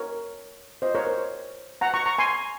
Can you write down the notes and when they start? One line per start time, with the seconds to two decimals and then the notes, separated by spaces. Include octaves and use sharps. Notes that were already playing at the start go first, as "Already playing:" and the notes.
Already playing: A#4 C#5
0.82 C5 D#5
0.95 A#4 C#5
1.07 C5
1.81 F#5 A#5
1.94 A#5 C#6
2.06 A#5 C#6
2.18 G#5 C6